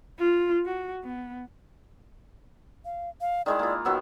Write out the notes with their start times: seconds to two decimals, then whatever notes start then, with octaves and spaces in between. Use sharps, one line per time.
0.19 F4
0.66 F#4
1.04 B3
2.85 F5
3.21 F5
3.46 D#3 G#3 E4 D5
3.59 A#3 F4
3.85 D#3 F#3 B3 E6